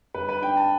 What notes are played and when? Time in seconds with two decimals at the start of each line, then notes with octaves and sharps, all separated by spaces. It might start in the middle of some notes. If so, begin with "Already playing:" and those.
0.14 G1 B4
0.29 B4
0.42 D4 G5
0.57 A5